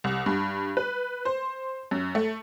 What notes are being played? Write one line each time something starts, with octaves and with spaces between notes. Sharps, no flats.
C2
G2
B4
C5
F#2
A3